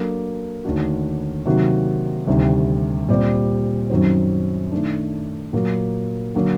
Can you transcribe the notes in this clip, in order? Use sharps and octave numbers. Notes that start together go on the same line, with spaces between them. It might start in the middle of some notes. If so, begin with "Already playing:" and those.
Already playing: F#3 A#3 D4 A4
D#2 D3 A3 D4 F#4
C3 D#3 F#3 A#3 F#4
D2 C3 D#3 G3
A#2 G3 C4 G4 D5
F#2 D#3 F#3 C4
D#3 A3 D4
A#2 F#3 A#3
D3 F#3 A#3 F#4